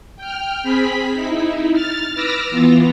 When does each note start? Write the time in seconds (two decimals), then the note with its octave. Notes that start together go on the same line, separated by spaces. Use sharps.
0.17 G5 F6
0.63 C4 G#4 B5 B6
1.14 D#4 E4
1.73 F6 A6
2.15 B4 D6 E6 F6 A#6
2.50 E3 B3 F4